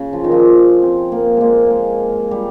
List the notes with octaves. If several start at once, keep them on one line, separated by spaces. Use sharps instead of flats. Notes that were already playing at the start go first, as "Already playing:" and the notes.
Already playing: C#3
F3
D#3
F3
C4
A#3
G#3 A#3
G#3 A#3
G3